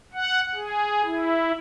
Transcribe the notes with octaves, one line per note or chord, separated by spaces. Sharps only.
F#5
G#4
E4